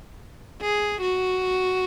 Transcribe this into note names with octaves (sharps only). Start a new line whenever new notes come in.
G#4
F#4